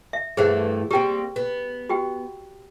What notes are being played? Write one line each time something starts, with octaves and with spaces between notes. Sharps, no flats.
E5
G2 E3 A3 G#4 C5 F#5
G3 A#3 C4 G4 G5
B3
F#4 G4 G5